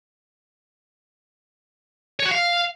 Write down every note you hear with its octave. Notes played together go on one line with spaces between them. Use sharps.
C#5
F#4
F5